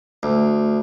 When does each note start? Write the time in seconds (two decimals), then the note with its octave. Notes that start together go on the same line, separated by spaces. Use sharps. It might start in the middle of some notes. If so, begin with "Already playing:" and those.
0.23 D2